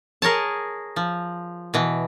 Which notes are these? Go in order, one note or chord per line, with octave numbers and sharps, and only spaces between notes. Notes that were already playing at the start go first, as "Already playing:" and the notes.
G#4 A#4 C#5 A5
F3
B2 E3